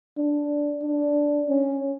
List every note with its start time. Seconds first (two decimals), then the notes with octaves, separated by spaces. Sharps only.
0.17 D4
0.83 D4
1.48 C#4